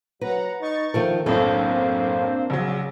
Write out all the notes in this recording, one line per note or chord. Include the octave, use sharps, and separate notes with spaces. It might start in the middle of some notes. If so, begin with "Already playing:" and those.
F#3 B4 F#5 A#5
D#4 C#6 A6
D#3 F3 A3 A4 A#4
B1 F#2 A2 A#3 C4 D4 A4 C5
A#1 C#3 F#3